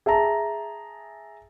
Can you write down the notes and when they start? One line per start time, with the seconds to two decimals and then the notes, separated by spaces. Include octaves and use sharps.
0.06 G#4 E5 A5 A#5